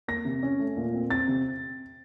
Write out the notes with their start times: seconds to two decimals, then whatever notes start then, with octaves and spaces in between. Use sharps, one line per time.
0.08 A#3 A#6
0.25 C3
0.43 C#4
0.59 A3
0.77 A#2
0.94 C4
1.10 C4 A6
1.28 C3